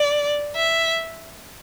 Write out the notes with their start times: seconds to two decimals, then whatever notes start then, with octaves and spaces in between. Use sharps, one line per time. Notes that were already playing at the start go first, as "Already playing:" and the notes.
Already playing: D5
0.56 E5